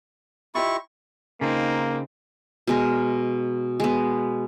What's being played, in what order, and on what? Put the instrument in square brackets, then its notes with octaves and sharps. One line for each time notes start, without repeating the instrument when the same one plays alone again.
[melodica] E4 C#6 [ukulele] F4 G4 D#5
[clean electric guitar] C#3 F4 [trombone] A#3 [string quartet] C4 D#4
[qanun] B2 G#3 A#4
G#3 B3